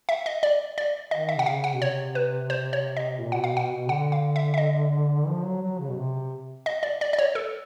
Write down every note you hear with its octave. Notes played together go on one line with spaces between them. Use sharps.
E5
D#5
D5
D5
D#3 D#5
E5
C3 F#5
C#3 F5
F#5
B2
C3 C#5
B4
C5
C#5
D#5
A#2
B2 F#5
F5
B2 F#5
B2
D3 F#5
F5
E5
E5
D#5
F3
F#3
F#3
C#3
B2
C3
D#5
D5
D5
D5
C#5
A4